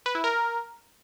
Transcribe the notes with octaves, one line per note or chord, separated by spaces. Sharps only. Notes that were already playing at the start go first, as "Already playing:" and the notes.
B4
E4
A#4